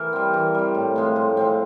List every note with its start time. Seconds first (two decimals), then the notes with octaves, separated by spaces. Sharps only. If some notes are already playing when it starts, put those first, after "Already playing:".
Already playing: E3 A#4
0.13 G3 C4
0.33 E3 A#4
0.55 G3 C4
0.75 A2
0.96 F3 G#3 C4
1.16 A2
1.37 F3 G#3 C4